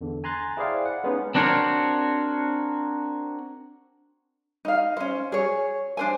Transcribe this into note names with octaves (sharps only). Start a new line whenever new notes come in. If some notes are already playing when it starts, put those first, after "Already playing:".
E2 D3
G#5 A#5 C6 F#6 G#6 A6
E4 G#4 C5 D5 F5 G5
F#5
G#3 B3 C#4 D#4
C4 D4 F#4 A#4 C5 C#5
D#4 F5
C#4 C5
G#4 C#5
D4 C5 G#5